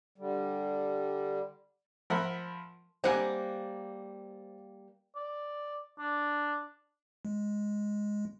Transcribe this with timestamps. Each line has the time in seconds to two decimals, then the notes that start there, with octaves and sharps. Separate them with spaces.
0.18 D3 G3
2.10 F3 A#4 E5 F#5 B5
3.04 G3 A#3 C4 F#5 G#5
5.16 D5
5.99 D4
7.25 G#3